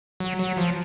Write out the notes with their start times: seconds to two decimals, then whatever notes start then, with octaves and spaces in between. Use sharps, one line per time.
0.20 F#3
0.39 F#3
0.57 F3